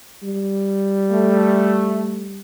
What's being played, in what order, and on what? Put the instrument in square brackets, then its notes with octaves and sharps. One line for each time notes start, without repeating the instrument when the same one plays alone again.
[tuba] G3
[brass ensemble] A3